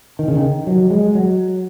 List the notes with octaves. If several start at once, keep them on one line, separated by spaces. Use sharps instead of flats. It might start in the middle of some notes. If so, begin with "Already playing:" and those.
D#3
C#3
D#3
F#3
G#3
F#3